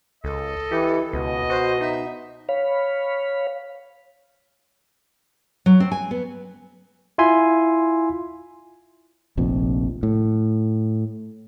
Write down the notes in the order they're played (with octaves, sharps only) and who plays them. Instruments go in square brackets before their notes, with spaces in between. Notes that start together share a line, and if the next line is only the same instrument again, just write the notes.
[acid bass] C#2 [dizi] A4 [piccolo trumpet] D#5
[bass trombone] E3 [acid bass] G4
[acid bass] C#2 [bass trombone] B2 [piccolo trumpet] D#5
[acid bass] F#4 [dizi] C5
[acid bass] D#4 [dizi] E5
[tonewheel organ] C#5 F5 B5
[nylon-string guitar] F#3
C4
G#5
B3
[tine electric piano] E4 F4 E5 G#5 C6
[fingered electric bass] F1 A#1 F2
A2